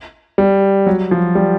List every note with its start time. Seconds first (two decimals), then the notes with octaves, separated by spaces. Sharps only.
0.38 G3
0.86 F#3
1.11 F3
1.35 G3